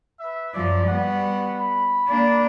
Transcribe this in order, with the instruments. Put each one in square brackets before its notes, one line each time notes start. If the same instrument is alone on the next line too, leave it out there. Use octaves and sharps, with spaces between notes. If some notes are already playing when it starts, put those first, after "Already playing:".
[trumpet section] B4 E5
[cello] F#2 F3 [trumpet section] D5
[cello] G3 B3 [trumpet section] F#4 F#5
[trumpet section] B5
[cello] A#3 D4